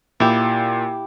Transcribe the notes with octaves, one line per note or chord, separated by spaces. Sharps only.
A#2 E4 G4